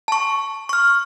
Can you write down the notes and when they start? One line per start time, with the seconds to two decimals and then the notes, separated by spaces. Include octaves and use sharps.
0.08 A5 C#6
0.69 C#6 F6